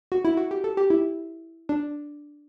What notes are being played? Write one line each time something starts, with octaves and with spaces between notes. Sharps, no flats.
F#4
E4
F#4
G4
A4
G4
E4
D4